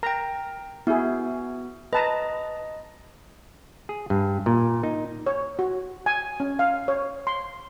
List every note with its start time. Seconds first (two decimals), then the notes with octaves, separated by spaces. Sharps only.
0.03 A#4 G5 A#5
0.87 B3 E4 F#4 G#4
1.93 B4 D#5 A5 A#5
3.89 G#4
4.10 G2
4.46 A#2
4.83 D#4
5.26 C#5
5.59 F#4
6.06 G#5
6.40 C#4
6.59 F5
6.88 C#5
7.27 C6